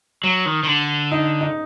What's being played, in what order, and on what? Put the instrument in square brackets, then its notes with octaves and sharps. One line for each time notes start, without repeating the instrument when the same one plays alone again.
[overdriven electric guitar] F#3
D#3
D#3
D3
[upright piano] D#4
D#4